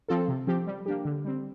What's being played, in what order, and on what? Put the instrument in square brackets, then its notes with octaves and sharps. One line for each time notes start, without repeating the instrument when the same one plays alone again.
[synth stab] F3 C4 F4 A4
C3
F3 C4 G4
G3
A#3 D4 G4
D3
G3 C4